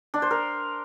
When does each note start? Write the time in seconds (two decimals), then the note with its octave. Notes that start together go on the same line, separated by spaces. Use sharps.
0.14 D4
0.22 C5
0.31 A#4